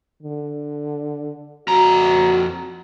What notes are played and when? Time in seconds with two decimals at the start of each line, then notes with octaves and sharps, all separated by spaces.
0.23 D3
1.68 F2 F#4 A#5